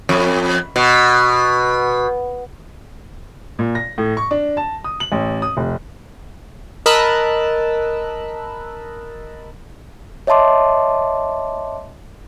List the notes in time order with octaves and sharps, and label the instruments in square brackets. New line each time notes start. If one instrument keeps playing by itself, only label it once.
[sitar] F2
B2
[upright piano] A#2
A#6
A2
C#6
D4
A5
D#6
F#7
A1
D#6
F1
[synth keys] A#4 D#5 A5 B5 E6 F#6
[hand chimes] C#5 D#5 E5 A5 C6 D6